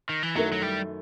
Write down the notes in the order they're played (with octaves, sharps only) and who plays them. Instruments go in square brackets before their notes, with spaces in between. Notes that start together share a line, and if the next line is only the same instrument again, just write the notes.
[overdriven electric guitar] D#3
E3
[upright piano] F#2 D#3 A3 E4 [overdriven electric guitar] F#3
[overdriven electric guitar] F#3
G3